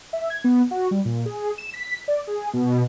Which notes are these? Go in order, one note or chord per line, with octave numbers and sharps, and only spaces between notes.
E5
G#6
B3
F#4
G3
A#2
G#4
E7
B6
D5
G#4
B2